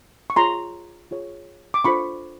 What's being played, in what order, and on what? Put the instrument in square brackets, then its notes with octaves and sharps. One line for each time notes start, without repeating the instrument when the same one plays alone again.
[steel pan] C#6
F4 G#4 C#5 A#5 C6
F4 G#4 C#5
D6
D4 F4 A4 C5 B5 C#6